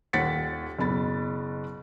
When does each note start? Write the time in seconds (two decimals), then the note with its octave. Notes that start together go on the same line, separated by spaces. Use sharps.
0.13 D#1 D#2 F#5 A6 B6 C#7
0.79 F#1 B2 B5 A6